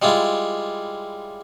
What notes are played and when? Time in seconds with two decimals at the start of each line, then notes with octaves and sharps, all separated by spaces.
0.02 G3 G#3 E4 F4